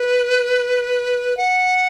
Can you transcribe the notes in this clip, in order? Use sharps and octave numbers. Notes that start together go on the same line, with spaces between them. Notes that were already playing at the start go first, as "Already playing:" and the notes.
Already playing: B4
F#5